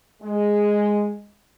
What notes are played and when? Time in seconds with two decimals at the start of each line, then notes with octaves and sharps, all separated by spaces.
0.22 G#3